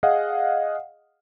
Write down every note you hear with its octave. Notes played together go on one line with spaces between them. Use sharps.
G#4 D#5 F5 F#5